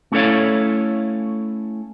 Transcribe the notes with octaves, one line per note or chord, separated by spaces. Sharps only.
A3 C#4 E4 A4 C#5 F5